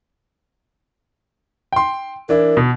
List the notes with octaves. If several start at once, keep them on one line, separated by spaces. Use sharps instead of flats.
G5 C6
E3 D4 E4 A#4
B2